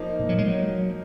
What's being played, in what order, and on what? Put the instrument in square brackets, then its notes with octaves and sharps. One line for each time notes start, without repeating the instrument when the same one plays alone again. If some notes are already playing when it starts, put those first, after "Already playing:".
Already playing: [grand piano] F3 A#3 D#4 A#4
[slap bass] A#2
F#3
G#3
F#3